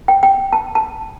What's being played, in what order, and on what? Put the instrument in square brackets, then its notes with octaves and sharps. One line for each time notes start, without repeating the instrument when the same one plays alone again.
[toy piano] G5
G5
A5
A5